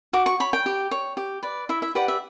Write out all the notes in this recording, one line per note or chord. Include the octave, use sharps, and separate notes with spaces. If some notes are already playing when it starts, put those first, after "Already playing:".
F#4 D6
C#6
C#5 B5
G5
G4
C#5
G4
B4 D5
E4 E5
E5
G4 B4 D5 F#5
E5